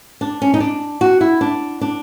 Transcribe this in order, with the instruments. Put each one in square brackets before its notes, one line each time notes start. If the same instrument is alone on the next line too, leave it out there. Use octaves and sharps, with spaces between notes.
[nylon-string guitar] D4
C#4
D#4
D4
F#4
E4
D4
D4